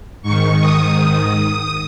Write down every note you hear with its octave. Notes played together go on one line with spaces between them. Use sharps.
G#2 D#3 C#6
D#6